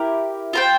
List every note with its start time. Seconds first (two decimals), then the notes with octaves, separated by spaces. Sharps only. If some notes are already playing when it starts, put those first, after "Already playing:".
Already playing: E4 G4 A#4
0.53 F4 C5 G5